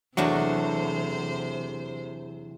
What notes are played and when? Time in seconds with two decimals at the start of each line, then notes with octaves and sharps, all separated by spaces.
0.17 E2 C3 F#3 A3 D4 F#4 C5